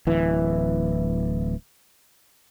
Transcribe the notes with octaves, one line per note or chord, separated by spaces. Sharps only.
D1 E3